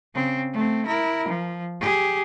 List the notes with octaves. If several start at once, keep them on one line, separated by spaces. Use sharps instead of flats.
C#3 C4
A3 C4
E4 A#4
F3
G4 G#4